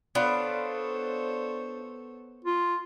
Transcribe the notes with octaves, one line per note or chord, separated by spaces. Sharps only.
B3 D4 F4 A4 C5 C#5
F4